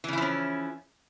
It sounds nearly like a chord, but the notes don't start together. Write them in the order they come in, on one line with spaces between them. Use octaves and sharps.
E3 C#3 E4 F3 C#4